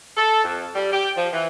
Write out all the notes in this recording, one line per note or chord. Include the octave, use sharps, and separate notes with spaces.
A4
F2
G3
G4
F3
E3